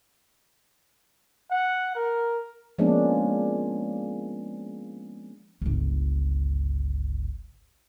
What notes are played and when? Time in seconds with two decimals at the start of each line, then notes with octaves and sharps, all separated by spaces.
1.51 F#5
1.96 A#4
2.78 F3 G#3 A#3 B3 C#4 D4
5.61 G1 C#2